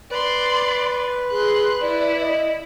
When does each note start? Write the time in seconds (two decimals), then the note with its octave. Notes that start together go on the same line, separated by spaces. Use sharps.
0.11 B4 D5 C6
1.31 G#4 C6 F#6
1.81 E4 D5
2.21 D#5